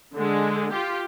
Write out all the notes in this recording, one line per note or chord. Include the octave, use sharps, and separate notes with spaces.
D3 G#3
F4 G4